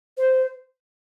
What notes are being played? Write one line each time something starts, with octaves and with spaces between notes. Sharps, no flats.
C5